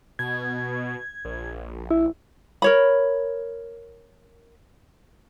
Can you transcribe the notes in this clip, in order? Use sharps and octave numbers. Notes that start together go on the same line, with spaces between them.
B2 G#6
A#1
E4
A#4 C#5 B5